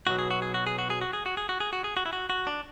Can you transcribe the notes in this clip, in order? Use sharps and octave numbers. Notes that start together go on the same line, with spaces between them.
B1 B2 F#3 F#4
G#4
F#4
G#4
F#4
G#4
F#4
G#4
F#4
G#4
F#4
G#4
F#4
G#4
F#4
G#4
F#4
E4
F#4
F#4
D4